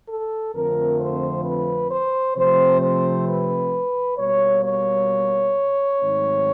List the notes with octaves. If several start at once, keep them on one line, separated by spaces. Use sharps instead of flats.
A4
F2 D3 F3 A3 C4 A#4
C5
B4
C5
C3 F3 A3 C4 C5
C5
B4
B2 G3 A#3 C#5
C#5
G#2 D#3 F#3 A3 C4